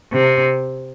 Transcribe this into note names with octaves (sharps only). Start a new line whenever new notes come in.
C3